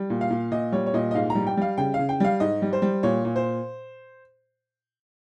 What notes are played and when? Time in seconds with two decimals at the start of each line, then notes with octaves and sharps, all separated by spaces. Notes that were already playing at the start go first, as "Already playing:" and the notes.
Already playing: G3
0.10 A#2
0.21 F5
0.30 A#2
0.51 A#2 D#5
0.72 G3 C#5
0.86 C#5
0.94 A#2 D#5
1.11 D#5
1.14 G#2 F5
1.30 A#5
1.35 G3
1.47 G5
1.57 G3 F5
1.78 C#3 G5
1.94 F5
1.99 C#3
2.09 G5
2.20 G3 F5
2.40 G#2 D#5
2.62 G3
2.73 C5
2.82 G3
3.03 A#2 C#5
3.25 A#2
3.36 C5